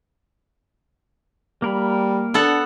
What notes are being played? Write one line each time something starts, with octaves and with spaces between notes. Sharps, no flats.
G3 A#3 A#4 B5
B3 D4 A4 F#5